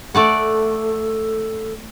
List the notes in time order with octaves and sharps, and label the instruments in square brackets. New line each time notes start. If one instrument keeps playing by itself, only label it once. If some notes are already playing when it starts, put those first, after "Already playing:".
[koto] A3 D5 F#5 [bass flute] A4